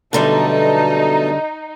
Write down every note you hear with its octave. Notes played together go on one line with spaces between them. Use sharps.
F#2 B2 D3 G3 A3 D#4 A5